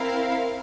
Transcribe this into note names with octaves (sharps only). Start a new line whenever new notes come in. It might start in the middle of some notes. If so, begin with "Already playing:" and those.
Already playing: C4 E4 A#4 F5